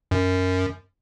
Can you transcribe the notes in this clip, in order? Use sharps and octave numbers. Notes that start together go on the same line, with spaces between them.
F#2